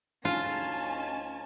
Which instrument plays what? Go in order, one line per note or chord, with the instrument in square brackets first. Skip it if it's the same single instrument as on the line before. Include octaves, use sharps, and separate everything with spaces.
[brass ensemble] D2 D#4 [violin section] C#4 G#5 A5 [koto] F4